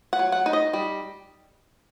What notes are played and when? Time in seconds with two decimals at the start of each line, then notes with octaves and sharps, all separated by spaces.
0.13 F#5
0.19 F#3
0.32 F#5
0.46 D#4
0.53 D#5
0.73 G3